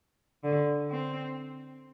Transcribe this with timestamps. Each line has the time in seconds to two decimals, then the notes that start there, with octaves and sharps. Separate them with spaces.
0.44 D3
0.90 C4